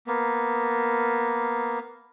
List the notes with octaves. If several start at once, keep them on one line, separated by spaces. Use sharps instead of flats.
A#3 B3